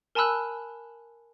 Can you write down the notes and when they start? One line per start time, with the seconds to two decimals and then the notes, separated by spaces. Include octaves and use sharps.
0.15 A#4 G#5 A5 B5 E6 F#6